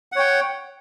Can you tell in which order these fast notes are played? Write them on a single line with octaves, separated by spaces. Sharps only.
F#5 C#5 G5